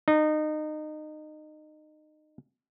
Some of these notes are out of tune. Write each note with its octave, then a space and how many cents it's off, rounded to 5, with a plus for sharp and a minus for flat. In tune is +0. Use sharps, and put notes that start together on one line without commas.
D#4 -25